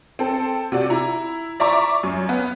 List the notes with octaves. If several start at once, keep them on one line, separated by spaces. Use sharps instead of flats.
C4 A4
C3 F#4 D5
E4 A#5
D5 E5 A#5 C#6 D6
F#2
B3